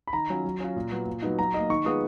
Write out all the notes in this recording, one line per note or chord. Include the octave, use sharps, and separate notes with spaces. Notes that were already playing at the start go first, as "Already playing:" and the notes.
B5
D#3 A#5
F#3 C#4 F4
F#3
C#4 F4
A#2
F#3 B3
A#2
F#3 B3 D#4
F#3 A#5
A#3 D#4 D#5
D#3 C#6
G#3 B3 F4 D#6